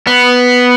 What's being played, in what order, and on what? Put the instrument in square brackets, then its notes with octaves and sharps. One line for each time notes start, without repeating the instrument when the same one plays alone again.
[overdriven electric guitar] B3